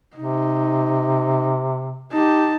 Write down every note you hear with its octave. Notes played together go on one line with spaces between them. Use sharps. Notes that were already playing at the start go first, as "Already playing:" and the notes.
C3 D#4
D#4 G4 A5